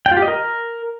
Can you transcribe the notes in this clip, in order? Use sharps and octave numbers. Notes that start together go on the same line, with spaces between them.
G5
F4
G4
D#5
A#4